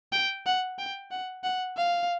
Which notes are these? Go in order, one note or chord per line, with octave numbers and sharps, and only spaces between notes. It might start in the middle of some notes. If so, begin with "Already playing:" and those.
G5
F#5
G5
F#5
F#5
F5